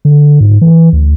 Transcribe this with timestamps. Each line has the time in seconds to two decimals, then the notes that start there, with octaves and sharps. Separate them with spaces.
0.05 D3
0.40 G#2
0.61 E3
0.93 D2